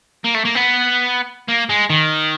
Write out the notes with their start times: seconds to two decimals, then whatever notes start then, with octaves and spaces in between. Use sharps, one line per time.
0.25 A#3
0.35 A3
0.45 A#3
0.55 B3
1.48 A#3
1.69 G#3
1.90 D#3